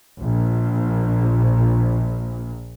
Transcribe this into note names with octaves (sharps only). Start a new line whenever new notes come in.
A#1 A#2